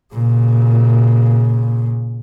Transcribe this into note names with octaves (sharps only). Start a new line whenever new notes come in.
A#2 C#3